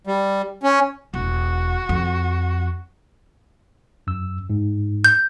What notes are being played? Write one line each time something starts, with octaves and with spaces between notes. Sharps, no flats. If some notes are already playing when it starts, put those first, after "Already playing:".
G3
C#4
E1 F#4
F2
F#2 E6
G#2
G6